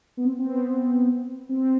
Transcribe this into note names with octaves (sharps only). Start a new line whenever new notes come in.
B3
C4
C4
B3
C4
C4